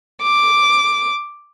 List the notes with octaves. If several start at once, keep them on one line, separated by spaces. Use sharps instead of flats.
D6